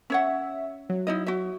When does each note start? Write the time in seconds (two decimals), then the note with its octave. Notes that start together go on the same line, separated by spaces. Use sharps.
0.10 C#4 C#5 E5 F#5
0.89 F#3
1.07 D#4 E4 D#5
1.27 F#4 E5